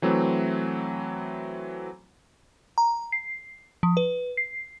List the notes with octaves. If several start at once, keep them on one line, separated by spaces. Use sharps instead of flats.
E3 F#3 A3 C4
A#5
C7
F3
B4
C7